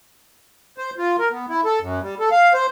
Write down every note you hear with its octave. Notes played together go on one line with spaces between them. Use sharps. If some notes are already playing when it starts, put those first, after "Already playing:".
C5
F4
A#4
B3
E4
A4
F#2
G3
A4
F5
C5